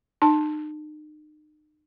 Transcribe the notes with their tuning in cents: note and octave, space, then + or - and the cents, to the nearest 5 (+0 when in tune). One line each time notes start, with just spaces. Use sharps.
D#4 -35 A5 +0